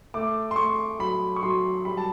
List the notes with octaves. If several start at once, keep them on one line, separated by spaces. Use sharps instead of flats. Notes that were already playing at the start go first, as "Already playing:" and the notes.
A3 D6
C6
A3 C#6
F#3 B5
C#6
F#3 C6
G3 B5
A5